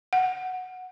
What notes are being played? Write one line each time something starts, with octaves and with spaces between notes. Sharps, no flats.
F#5